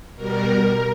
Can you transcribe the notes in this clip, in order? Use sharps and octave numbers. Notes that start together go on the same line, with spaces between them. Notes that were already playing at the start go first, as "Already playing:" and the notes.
B2 G3 A#4